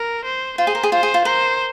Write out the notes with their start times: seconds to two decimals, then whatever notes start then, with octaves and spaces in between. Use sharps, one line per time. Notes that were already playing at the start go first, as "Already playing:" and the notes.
Already playing: A#4
0.25 C5
0.58 F4 C5
0.67 G#4
0.75 A#4
0.83 G#4
0.92 F4 C5
1.03 G#4
1.14 F4
1.25 A#4 C5